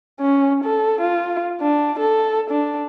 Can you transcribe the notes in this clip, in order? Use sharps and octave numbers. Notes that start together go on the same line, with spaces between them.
C#4
A4
F4
D4
A4
D4